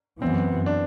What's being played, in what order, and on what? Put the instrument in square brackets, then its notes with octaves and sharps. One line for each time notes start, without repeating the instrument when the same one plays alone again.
[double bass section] F#2 E3 B3 [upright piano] C4
[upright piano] D4